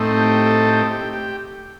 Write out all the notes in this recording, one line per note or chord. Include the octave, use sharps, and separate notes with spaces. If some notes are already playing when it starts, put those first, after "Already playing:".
Already playing: A2 A3 C4 D#4
G4
A4
G4
G4
G4